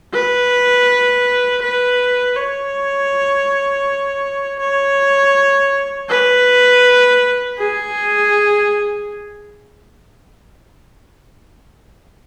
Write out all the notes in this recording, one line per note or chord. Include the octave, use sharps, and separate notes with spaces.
B4
B4
C#5
C#5
B4
G#4